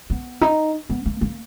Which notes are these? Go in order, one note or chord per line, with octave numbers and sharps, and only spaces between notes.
B3
D#4
B3
A#3
A#3